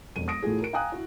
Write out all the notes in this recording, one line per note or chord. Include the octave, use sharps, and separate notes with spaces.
E1 F2 D#7
D#6 A#6 D7
A2 E3 A3 F4 F#4 G#4
A#4 D7
F5 G5 G#5 A#5 D#6 F#6
E4 F#4